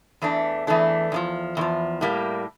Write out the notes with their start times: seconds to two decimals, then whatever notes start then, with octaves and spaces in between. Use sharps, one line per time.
0.22 E2 E3 A3 D4
0.67 E2 E3 A3 D4
1.12 E2 D3 F3
1.57 E2 D3
1.61 F3
2.01 A2 G3 A#3